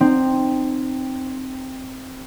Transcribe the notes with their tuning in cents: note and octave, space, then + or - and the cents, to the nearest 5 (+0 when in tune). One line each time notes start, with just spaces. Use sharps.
C4 +0 D#4 -30